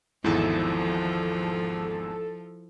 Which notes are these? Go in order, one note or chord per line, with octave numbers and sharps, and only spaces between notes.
G#1 E2 G#2 F3 E4 A4